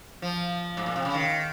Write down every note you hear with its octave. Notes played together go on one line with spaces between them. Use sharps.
F3
G#2
A#2
C3
C#3
D#3